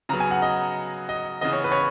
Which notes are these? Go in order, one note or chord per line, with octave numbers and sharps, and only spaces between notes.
C#3 F#3 B3 A#5
G#5
F#5
D#5
D#5
C#3 E3 B3 D#5
C#5
B4
C#5